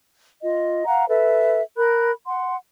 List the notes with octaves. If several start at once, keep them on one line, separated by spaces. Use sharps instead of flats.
F4 D#5
F5 F#5 A#5
A4 B4 E5
A#4 B5 F#6
F#5 C6